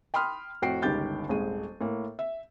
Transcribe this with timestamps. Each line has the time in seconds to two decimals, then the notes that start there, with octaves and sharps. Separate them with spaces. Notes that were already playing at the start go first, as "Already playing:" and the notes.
0.14 G5 B5 C6 D#6 F6
0.62 F2 A2 F#4 G5 C7 D7
0.82 G1 C#2 D#3 G4 G6 A6
1.29 D#1 G#1 G#3 D#7
1.81 A2 A#3
2.19 E5